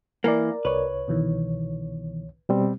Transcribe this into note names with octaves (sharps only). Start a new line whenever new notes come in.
E3 A#3 A#4 D5
C2 B4 C#5
B2 D#3 E3
B2 G3 C4